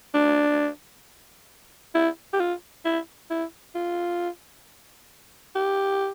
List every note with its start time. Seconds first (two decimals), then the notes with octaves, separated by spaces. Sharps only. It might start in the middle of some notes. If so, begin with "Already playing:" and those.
0.14 D4
1.95 E4
2.33 G4
2.40 F4
2.85 E4
3.31 E4
3.75 F4
5.55 G4